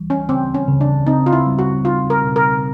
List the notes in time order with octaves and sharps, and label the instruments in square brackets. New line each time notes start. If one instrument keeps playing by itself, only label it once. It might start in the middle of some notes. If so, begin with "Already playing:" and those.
Already playing: [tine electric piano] E3 G3
[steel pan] C#4
[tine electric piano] C#3 [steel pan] C4
[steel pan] C#4
[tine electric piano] C#3
[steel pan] D4
[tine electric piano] C4 [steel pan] D#4
[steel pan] F4
E4
[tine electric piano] G3
[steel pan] F#4
[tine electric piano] D#4 [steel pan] F4
[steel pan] A#4
[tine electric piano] B2
[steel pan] A#4